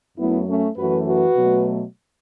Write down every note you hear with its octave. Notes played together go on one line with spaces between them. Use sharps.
F#2 F#3 A3 B3 E4
A3 C#4
F#2 E3 A3 F#4 B4
F#4 B4
B2 F#3 A3